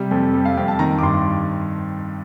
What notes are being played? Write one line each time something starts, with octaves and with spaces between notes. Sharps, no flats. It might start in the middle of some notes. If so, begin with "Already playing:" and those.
Already playing: C3 G3
F2 A4
G3 A4
F5
F2 G5
A5
D#3 A#5
D6
G2 C6